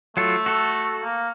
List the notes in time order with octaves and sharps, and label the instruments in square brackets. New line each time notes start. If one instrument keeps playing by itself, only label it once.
[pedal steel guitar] F#3 F4 A4 [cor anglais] A3
[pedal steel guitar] F#4 A4
[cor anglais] A#3